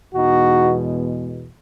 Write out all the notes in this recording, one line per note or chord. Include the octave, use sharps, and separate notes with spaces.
E2 B2 G#3 D#4 F#4